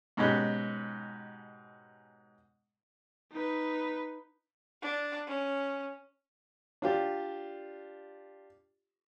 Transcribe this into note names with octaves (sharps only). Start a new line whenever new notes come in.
G#2 B2 C#4 G4 F#6
D#4 B4
D4
C#4
D4 F4 G4